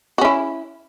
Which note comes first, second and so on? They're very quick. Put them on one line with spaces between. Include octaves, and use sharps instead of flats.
F#4 C#4 E4